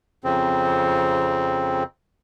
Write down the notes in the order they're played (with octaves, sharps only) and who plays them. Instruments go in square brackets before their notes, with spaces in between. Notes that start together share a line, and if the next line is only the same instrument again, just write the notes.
[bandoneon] F2 C#3 C4